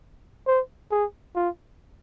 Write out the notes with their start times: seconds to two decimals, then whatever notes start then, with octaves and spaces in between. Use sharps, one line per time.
0.47 C5
0.91 G#4
1.36 F4